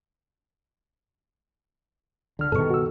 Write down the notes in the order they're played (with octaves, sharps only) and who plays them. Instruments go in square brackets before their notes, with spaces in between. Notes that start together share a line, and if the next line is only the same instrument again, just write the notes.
[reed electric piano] C#2 F6 [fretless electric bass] D3
[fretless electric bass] G2 B2 D#3 [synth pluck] A4 C#6
[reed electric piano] F#4 E6